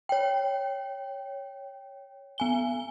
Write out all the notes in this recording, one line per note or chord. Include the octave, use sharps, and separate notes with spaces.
C#5 G5
B3 G#5 G7